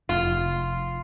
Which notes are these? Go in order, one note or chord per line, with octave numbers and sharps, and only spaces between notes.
F1 F4